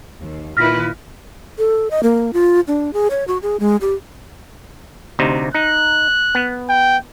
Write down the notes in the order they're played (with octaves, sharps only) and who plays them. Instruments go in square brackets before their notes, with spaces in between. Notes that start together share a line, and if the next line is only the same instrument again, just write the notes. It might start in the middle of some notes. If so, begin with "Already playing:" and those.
[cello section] D#2
[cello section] A#2 D#3 E4 [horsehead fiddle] F4 B4 [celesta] F6 A#6 B6
[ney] A4
D#5
A#3
F4
D4
G#4
C#5
F#4
G#4
G#3
G4
[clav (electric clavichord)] D2 C3 D#4
[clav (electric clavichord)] D#4 [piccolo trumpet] F#6
[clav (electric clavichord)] B3
[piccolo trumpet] G5